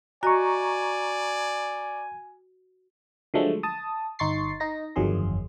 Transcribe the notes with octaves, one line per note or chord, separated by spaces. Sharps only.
F#4 D5 D#5 G#5 A#5 C#6
D3 F3 F#3 G#3 A3
A5 D#6
G1 D#4 C6 C#6 A6 C7
D#4 A#6
G1 F2 D#3 F#3 G#4 C6